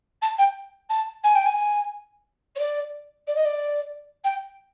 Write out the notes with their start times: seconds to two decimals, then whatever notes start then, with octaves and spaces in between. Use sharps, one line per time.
0.22 A5
0.38 G5
0.89 A5
1.23 G#5
1.35 G5
1.45 G#5
2.55 C#5
2.59 D5
3.27 D5
3.35 D#5
3.45 D5
4.24 G5